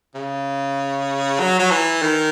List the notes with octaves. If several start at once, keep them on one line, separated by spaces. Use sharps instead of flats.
C#3
F#3
F#3
E3
D#3